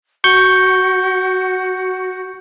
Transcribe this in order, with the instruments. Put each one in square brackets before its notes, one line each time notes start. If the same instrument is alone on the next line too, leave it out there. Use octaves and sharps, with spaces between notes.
[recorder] F#4 [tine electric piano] C#6 G6